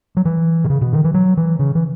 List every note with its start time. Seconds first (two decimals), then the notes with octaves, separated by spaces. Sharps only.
0.17 F#3
0.25 E3
0.64 B2
0.70 C#3
0.81 B2
0.93 D#3
1.04 E3
1.14 F#3
1.37 E3
1.59 C#3
1.75 E3